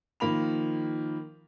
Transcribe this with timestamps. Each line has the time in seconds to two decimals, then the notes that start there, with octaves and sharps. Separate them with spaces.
0.20 D#3 F3 A#3 B5 F7